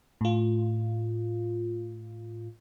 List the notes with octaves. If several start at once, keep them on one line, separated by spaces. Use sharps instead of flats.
A2 F4